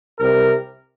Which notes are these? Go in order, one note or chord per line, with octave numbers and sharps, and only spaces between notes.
C2 C3 G3 A#4